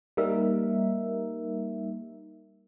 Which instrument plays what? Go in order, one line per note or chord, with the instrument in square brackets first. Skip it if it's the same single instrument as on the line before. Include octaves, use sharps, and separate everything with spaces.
[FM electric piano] G3 A#3 D#4 A#4 E5